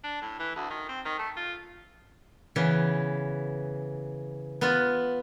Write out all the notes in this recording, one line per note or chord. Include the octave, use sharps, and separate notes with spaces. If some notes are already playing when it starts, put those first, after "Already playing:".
D4
A2
E3
D2
D#3
C4
D#3
A3
F4
C#3 E3 B3
B3 F4